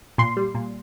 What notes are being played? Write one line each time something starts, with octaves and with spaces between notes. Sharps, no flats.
A#2 C6
G3
A#2